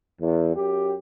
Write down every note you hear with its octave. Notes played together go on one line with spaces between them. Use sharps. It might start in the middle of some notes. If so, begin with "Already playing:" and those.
E2
F#2 G4